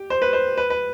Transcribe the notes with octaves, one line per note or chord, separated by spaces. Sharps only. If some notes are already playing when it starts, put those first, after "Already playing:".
Already playing: G4
C5
B4
C5
B4
B4